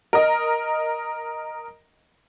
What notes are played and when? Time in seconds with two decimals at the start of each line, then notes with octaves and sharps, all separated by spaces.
0.13 A#4 D#5